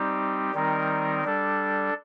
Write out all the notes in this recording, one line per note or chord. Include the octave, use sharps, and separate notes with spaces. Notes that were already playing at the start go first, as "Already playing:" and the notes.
Already playing: G3 C4 D#4 G4
D#3 G3 C4 D#4 A#4
G3 D4 A4